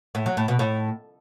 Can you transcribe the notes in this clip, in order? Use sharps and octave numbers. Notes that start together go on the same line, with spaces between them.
A2
F#3
A2
B2
A2